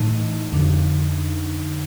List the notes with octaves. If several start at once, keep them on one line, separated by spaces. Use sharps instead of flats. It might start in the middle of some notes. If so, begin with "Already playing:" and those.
Already playing: A2 E3 D#4
F2 D3